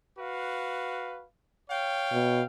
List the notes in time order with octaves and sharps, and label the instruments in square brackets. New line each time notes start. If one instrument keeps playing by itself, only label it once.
[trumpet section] F#4 B4 F5
C#5 F5 G5
[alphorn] B2